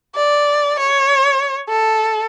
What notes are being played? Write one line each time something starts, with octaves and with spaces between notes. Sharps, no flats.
D5
C#5
A4